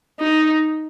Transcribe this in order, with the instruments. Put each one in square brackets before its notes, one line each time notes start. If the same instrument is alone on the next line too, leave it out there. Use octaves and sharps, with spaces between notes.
[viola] D#4